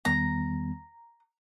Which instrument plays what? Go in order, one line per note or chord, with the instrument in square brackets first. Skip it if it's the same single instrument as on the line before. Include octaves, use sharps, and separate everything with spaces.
[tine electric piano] E2 D#3 G3 B3 [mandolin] A#5